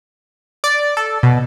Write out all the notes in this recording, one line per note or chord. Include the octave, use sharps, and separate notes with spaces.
D5
A4
B2